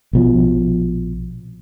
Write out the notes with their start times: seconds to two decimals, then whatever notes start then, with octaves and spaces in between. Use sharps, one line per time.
0.13 A#1 B2 F3